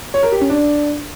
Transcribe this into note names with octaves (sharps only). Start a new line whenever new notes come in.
C#5
A#4
G4
C#4
D4